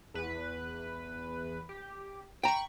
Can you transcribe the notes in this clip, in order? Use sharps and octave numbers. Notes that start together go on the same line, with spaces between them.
E2 B4
G4
G5 A#5 B5 C#6